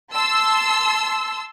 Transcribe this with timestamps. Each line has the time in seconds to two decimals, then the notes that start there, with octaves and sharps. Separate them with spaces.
0.13 A5 C6 E6